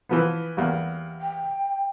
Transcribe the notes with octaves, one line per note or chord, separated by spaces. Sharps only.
E3 F3 B3
E2 G3 A#3
G5